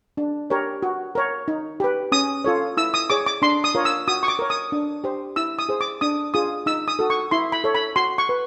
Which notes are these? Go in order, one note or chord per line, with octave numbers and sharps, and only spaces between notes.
D4
G4 A#4 C#5
F#4
A#4 C#5
D#4
G4 B4
C#4 D#6
F4 A4 C#5
E4 E6
D#6
G#4 C#5 D6
D6
D4 C6
D#6
F4 A#4 C#5
E6
F#4 D#6
C#6
D6
A#4 C#5
D#6
D4
G4 C5
E4 E6
D#6
G#4 C5
D6
D4 D#6
F4 G#4 D#6
D#4 E6
D#6
F#4 A4
C#6
E4 C6
B5
A4 C#5
B5
F#4 C6
C#6
B4